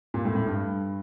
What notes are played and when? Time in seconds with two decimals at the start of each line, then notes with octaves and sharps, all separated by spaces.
0.14 A#2
0.25 A2
0.35 A2
0.47 G2